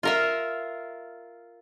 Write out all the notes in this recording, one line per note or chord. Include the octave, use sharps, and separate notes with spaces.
F4 A#4 E5